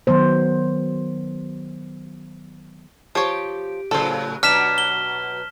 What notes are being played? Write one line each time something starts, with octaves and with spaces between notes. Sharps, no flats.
D#3 F#3 B3 C5
F3 G4 C#5
A2 C#3 F#3 A4 C5
B2 F#3 D4 F6 B6 E7
G7